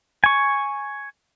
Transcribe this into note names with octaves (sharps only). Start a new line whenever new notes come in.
G#5 C#6